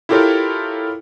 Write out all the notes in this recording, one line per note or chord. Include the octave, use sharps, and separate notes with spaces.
E4 F4 G4 A4 A#4 C#5